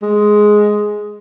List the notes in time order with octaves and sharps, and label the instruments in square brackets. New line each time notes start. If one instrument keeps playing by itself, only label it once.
[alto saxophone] G#3